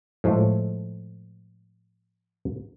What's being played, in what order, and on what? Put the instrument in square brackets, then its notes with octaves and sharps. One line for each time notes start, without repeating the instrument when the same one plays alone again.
[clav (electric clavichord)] A2 F3 G#3 A3